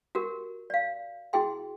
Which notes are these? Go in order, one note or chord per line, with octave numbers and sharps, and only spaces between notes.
F#4 G4 A#4
D5 F5
E4 F#4 G#4 G5 C6